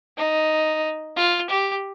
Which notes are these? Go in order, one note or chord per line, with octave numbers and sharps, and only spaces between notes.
D#4
F4
G4